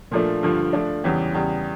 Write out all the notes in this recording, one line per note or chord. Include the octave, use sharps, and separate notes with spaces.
A#2 F3 A3 D4
G2 D3 F3
F3 A3 D4
E2 C#3 E3 G3 C#4
E2 C#3 G3